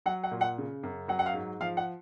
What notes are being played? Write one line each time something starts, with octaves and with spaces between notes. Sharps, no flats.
F#3 F#5
F#5
A#2
F#5
C#3
F#2
F#3 F#5
F#5
F5
G#2
F3 F5
F#5